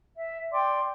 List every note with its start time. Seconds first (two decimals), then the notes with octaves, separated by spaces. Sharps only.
0.16 E5
0.52 D5 G5 C6 D6